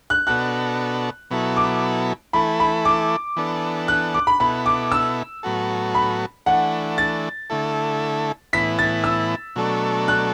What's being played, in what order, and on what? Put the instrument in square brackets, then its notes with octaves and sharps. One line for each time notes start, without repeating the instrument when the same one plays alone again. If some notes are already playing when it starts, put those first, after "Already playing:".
[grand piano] F#6
[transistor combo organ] B2 B3 D4 F#4 A4 [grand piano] F#6
[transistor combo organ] B2 F#3 B3 E4 A4
[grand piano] D6
[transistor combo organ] E3 A3 E4 A4 [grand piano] B5
[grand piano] B5
D6
[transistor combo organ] E3 B3 D4 A4
[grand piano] F#6
D6
B5
[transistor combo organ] B2 B3 E4 A4 [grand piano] B5
[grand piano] D6
E6
[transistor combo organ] A2 F#3 B3 F#4 A4
[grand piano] B5
[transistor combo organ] E3 A3 D4 [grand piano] F#5
[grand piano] A6
[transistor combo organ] D3 A3 E4 A4
[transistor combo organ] A2 E3 B3 E4 [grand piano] B6
[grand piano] A6
E6
[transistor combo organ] B2 F#3 A3 D4 A4
[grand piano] F#6